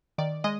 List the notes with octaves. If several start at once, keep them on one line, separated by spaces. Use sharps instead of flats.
D#3 D5
G#3 D#5